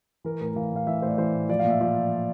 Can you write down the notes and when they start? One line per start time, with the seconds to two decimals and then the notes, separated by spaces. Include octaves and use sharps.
0.24 E3 A#4
0.40 A2 A#4
0.56 E3 F5
0.72 A2 F5
0.87 E3 E5
1.02 A2 C5 D5
1.18 E3 C5
1.34 A2
1.49 F3 D5
1.59 F5
1.65 A#2
1.70 E5
1.81 F3 D5